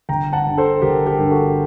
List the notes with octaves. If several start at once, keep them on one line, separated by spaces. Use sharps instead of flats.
G1 G5 A#5
F#5 A5
G2 D3
A4 C5
G1 G4 A#4
G4 A#4
G2 D3
F#4 A4